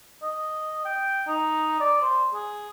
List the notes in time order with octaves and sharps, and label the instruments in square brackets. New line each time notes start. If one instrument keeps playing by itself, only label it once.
[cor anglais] D#5
G5
D#4
D5
C5
G#4